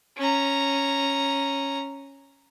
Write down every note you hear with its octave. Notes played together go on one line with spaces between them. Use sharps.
C#4 A#5